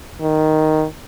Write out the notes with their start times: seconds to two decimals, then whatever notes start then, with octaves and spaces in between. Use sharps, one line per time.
0.21 D#3